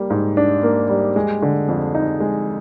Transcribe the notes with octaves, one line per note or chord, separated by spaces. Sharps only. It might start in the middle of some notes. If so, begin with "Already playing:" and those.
Already playing: G3 A#3
G#2
D4
A#3
G3
G#3
D3
F2
D#4
G#3